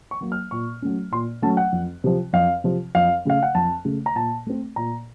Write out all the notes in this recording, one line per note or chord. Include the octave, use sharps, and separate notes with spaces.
C#6
F#3 A#3
F6
A#2 C#6
F#3 A3 C#4
A#2 C6
F#3 A3 C#4 A5
F#5
F2
C3 F3
F2 F5
C3 F3
F2 F5
C#3 A3 F5
F#5
F2 A5
C#3 A3
A#5
A#2 A5
A3 C4
A#2 A#5